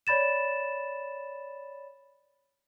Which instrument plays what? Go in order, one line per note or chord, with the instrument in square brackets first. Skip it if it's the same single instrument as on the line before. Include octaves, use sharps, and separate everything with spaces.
[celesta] C#5 D5 B5 A6 E7